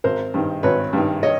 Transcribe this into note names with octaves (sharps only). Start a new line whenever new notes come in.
G#1 A#4 C5
G2 D#3
G#1 B4 C#5
G2 D#3
C#5 D#5